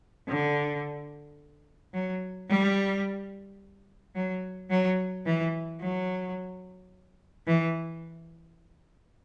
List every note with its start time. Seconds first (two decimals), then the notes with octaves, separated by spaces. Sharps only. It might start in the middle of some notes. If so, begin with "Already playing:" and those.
0.28 D3
1.94 F#3
2.49 G3
4.15 F#3
4.70 F#3
5.26 E3
5.80 F#3
7.47 E3